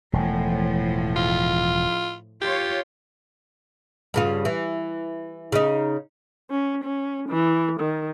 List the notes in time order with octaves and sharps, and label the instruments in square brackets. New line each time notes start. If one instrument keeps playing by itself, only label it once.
[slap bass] E1 [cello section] A2 F3
[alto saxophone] F4
[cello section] F4 C#5 [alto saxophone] G4
[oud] G2 C#3 F4
E3
C#3 D#4
[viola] C#4
C#4
E3
D#3